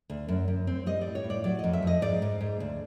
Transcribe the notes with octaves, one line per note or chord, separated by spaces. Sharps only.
D2
F#2
F#2
C4
G3 D#5
A2 D5
C#5
A2
D5
F#3 D5
D#5
F2
E5
F2 D#5
G#2 D5
G#2
G#2
D2